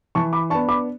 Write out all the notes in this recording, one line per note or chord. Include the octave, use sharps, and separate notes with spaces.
E3 A5 C#6
B5 D6
B3 D4 A5 C#6
B5 D6